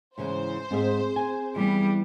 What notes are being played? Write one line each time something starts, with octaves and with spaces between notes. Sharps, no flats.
G#2 C#3 E3 C5
G#2 C4 G#4 E5
G#5
E3 G3 B3